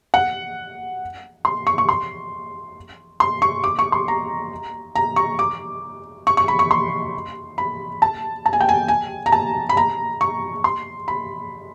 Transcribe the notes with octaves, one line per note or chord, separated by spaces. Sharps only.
F#5
C6
C#6
C#6
C6
C6
C#6
D6
C#6
C6
A#5
A#5
C#6
D6
C#6
C#6
B5
C#6
C6
B5
A5
A5
G#5
G5
G#5
G#5
A#5
A5
B5
A#5
C#6
C6
B5